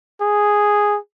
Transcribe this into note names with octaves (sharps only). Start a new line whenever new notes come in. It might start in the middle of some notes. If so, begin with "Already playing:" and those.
G#4